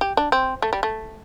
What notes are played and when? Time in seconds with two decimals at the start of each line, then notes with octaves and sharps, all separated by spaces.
0.01 G4
0.17 D4
0.32 C4
0.62 A3
0.73 G3
0.83 A3